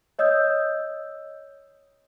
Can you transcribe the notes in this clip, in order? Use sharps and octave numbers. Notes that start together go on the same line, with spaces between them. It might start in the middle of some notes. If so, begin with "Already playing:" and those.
C#5 D#5 D#6 E6 G6